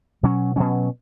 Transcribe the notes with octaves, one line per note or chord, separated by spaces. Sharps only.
B2 F#3 C#4
B2 F#3 C#4